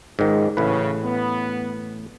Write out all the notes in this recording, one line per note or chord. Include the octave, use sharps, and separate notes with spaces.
C#2 G#2 D#3
A1 A2 C#3 B4
B3